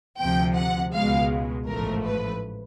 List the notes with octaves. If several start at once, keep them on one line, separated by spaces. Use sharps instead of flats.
D2 C3 F3 G5
F#5
C#2 B2 G#3 F5
A1 G#2 F3 A3 A#4
B4